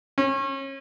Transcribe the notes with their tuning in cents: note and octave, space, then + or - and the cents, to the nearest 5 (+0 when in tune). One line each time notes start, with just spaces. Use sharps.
C#4 -35